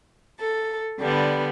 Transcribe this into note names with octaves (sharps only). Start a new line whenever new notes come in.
A4
D3 G3 B3